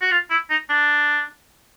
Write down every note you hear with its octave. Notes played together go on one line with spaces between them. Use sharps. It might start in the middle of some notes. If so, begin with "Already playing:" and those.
F#4
F4
E4
D#4
D4